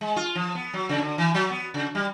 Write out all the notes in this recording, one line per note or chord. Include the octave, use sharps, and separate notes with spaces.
G#3
F4
F3
B3
F#3
C#3
D3
E3
F#3
B3
C#3
G3